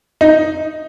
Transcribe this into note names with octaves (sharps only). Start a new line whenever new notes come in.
D#4